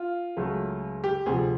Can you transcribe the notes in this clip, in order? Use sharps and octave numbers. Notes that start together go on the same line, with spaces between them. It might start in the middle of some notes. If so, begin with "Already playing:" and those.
Already playing: F4
C#2 C#3 F#3 A3
G4
D2 C3 F3 G#4